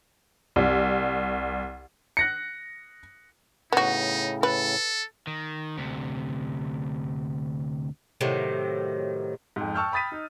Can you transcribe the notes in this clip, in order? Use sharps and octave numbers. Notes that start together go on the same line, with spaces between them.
C2
F#6 A#6 C#7
A2 C#3 B3 D#4 F#4
A4 B4
D#3
D2 C3
A2 C3 D#3 F#3
F2 G#2
G5 A5 C#6 E6 F6 G6
G5 B5 D#6 A6 B6 D#7
D#4